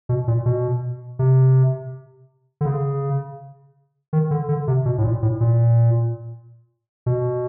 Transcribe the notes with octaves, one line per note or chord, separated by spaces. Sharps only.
B2
A#2
B2
C3
D3
C#3
D#3
D3
D3
C3
B2
A2
A#2
A2
A#2
B2